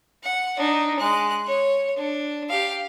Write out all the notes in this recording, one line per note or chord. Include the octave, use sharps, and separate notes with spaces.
F#5
D4 D#4
G#3 F#6
C#5
D4
G4 F5